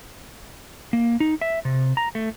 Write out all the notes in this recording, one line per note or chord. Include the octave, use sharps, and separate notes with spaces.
A#3
D#4
E5
C3
A#5
A3